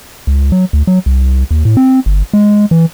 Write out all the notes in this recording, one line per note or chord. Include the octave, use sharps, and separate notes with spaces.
C#2
F#3
D2
F#3
C2
D#2
A2
C4
G1
G#3
E3